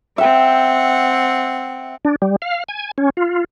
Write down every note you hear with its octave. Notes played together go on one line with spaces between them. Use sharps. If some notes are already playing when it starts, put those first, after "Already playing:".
C4 E5 F#5 G5
D4
G3
F5
G#5
C#4
F4